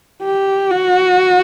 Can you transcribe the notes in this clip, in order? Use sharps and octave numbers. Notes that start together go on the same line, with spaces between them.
G4
F#4